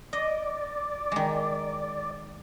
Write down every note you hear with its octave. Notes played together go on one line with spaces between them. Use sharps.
D5 D#5
D#3 G#3